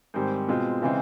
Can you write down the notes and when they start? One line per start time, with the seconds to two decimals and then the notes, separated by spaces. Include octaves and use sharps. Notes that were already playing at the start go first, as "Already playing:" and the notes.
0.14 G#2 D#3 G3 C4
0.48 B2 G#3 C4 F4
0.82 C#3 E3 G#3 C4